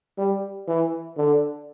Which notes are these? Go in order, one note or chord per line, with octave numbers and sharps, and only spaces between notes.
G3
E3
D3